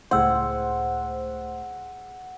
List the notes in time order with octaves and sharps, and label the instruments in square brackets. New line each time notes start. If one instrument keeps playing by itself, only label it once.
[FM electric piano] C#2 A2 C5 [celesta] G#4 G5 E6 [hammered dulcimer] F#5